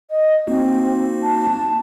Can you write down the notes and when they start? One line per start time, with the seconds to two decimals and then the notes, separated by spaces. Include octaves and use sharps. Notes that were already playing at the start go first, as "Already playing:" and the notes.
0.11 D#5
0.47 A#3 C4 D#4 F#4
1.23 A5